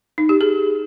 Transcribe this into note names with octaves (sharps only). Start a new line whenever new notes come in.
D#4
G4
G#4